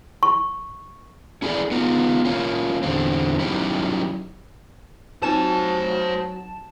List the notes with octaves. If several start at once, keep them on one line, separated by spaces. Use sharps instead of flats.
C#6
C#4 E4 G#4 A4 D5
B3 D#4 F4
A#3 C#4 F4
E2 D3 C4
F#3 C#4 D#4 E4 G4
F#3 C4 D#4 F4 C5 G#5 A5 E7